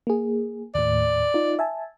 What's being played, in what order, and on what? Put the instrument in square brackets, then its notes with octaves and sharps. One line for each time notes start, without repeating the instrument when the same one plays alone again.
[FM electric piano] A#3 G#4
[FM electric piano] D#2 A2 [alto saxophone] D5
[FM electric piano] D#4 F4
E5 G#5 A5